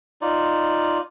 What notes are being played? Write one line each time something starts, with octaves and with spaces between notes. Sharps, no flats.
D#4 F4 D5